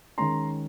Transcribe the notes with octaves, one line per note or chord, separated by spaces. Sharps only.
D#3 G#3 C#4 A#5 C6